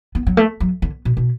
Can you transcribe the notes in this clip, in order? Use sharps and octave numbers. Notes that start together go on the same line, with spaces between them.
B3
F#3
A3
F#3
D3
B2
B2